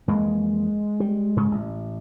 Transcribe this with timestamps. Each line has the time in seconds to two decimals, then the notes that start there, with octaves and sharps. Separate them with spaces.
0.08 F2 E3 G#3 A#3
1.00 G3
1.36 G#2 C#3 C#4
1.51 A1